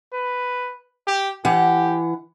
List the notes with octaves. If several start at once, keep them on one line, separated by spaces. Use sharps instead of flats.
B4
G4
E3 G4 F#5